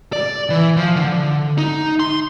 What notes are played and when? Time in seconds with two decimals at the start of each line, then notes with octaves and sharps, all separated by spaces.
0.13 D5
0.50 E3
0.76 F3
0.96 D3
1.58 D#4
2.00 C6